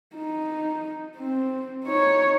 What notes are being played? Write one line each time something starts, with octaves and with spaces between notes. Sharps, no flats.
D#4
C4
D#4 C#5